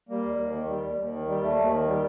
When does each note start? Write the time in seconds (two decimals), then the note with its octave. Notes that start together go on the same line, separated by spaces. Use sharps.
0.09 G3 A#3
0.24 D#2
0.38 D#2
0.53 D#3
0.68 G3
0.84 D#2
0.98 D#2
1.13 D#3
1.28 G3
1.42 D#2 A3
1.58 D#2
1.73 D#3
1.88 G3